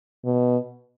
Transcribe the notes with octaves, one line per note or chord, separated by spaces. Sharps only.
B2